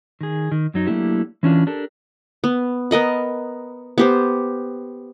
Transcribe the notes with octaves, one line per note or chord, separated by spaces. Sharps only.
D#3 G#4
D#3
F#2 F#3 D#4
F#3 A3 A#3 D4 E4 G4
E3 C#4 D4 F4
D4 G4 A4 A#4
B3
B3 A#4 D#5 B5
B3 G4 C5